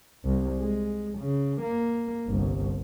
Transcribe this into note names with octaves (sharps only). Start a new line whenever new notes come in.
C2
G#3
C#3
A#3
G1 C2